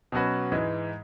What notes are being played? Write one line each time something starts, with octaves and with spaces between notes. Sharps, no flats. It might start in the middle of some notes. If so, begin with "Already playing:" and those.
B2 F#3 C#4 F#4 B4
G#2 E3 G#3